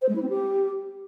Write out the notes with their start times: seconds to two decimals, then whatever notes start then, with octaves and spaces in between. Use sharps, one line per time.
0.02 C5
0.08 G#3
0.15 E4
0.22 C4
0.29 G4